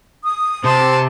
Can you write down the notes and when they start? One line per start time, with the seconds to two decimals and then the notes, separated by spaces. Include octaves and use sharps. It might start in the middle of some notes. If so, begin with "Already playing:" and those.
0.24 D#6
0.65 C3 C5 A5